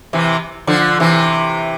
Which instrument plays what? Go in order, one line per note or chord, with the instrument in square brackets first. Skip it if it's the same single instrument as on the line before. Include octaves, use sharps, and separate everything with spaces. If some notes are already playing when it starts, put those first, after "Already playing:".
[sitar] C3 E3
D3 F3
C3 E3